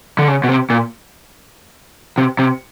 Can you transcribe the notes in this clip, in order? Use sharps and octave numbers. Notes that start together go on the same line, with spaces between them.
D3
C#3
B2
C3
A#2
C3
C3